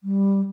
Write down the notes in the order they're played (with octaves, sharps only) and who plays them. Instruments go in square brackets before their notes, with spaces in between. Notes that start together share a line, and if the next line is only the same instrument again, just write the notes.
[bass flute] G3